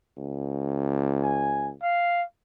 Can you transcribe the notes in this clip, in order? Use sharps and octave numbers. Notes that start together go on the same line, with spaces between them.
C#2
G#5
F5